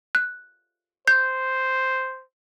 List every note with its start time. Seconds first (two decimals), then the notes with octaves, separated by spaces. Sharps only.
0.15 F#6
1.07 C5 G6